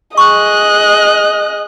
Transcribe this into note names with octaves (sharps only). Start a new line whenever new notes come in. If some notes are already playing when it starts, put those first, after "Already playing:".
G#4 D#5 C#6 F#6